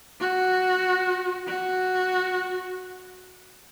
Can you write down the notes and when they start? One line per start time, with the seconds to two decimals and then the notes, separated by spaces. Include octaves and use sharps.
0.21 F#4
1.47 F#4